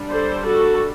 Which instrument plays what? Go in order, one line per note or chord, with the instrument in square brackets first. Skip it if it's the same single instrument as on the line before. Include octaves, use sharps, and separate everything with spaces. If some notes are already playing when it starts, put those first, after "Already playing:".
Already playing: [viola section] G3 D4
A4 C5
F#4 A4